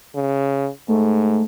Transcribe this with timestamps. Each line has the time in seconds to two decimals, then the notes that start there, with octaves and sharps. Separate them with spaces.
0.15 C#3
0.88 G#2 A3